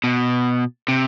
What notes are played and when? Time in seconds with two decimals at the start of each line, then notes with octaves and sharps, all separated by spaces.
0.04 B2
0.88 C3